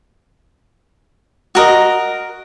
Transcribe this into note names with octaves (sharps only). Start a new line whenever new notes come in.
F#4 A#4 D#5